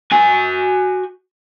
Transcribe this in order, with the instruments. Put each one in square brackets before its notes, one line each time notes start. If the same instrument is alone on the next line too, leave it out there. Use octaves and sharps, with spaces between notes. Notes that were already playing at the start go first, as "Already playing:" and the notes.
[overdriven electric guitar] F#4 G#5